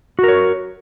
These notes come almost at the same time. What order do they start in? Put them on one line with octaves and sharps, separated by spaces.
F#4 A#4 C#5